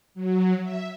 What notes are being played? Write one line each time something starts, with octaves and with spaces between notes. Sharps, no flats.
F#3
E5